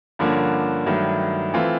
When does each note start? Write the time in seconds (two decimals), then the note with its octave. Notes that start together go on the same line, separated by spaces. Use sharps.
0.19 G2 D3 F3 A#3 C#4
0.86 G2 D#3 F#3 A3
1.54 E3 A3 C4 F4